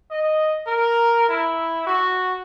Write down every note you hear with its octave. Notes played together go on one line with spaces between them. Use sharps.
D#5
A#4
E4
F#4